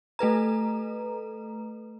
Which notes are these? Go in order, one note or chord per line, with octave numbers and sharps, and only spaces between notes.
A3 A4 B4 A#5